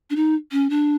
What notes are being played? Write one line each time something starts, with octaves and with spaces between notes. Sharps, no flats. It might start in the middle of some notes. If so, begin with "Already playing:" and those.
D4
D#4
C#4
D4